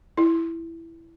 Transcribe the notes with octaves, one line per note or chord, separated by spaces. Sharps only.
E4